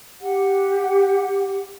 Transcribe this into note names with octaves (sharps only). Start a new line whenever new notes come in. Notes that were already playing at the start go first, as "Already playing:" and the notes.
G4 F#5